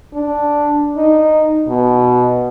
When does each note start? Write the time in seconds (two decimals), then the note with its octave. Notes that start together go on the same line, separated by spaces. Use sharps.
0.13 D4
0.97 D#4
1.68 B2